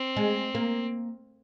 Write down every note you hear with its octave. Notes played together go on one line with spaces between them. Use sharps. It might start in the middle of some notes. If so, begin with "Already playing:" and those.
Already playing: C4
G#3
A#3